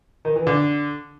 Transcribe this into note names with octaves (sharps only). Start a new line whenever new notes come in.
D#3
E3
D3